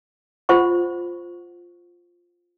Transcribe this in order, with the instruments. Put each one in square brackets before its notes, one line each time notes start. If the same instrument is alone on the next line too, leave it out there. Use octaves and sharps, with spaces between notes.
[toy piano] F4 C5 F#5 C#6